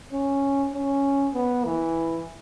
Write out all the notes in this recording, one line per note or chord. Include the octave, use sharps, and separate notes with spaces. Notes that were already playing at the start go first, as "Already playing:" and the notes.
C#4
C#4
B3
E3